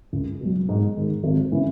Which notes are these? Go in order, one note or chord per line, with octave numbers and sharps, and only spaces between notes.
C#2
B2 F#3
G#2
D#3 G#3
G#1
C#3 E3